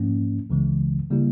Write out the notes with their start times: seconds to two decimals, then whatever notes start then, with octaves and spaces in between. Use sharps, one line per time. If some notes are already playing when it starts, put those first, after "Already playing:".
Already playing: G#2 F3 A#3 C#4
0.50 C#2 C#3 E3 G#3
1.11 C#3 G3 A#3 E4 G4